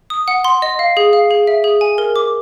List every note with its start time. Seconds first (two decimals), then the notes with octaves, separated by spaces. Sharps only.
0.10 D#6
0.28 F#5
0.45 C6
0.62 D#5
0.79 F5
0.97 G#4
1.13 F5
1.31 G#4
1.47 E5
1.64 G#4
1.81 G#5
1.98 A#4
2.16 D6